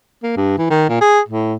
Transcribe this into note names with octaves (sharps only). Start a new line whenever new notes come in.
A#3
G2
E3
D#3
A#2
G#4
A2